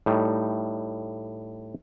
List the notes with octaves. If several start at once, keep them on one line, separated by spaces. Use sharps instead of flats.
A2 G3 D#4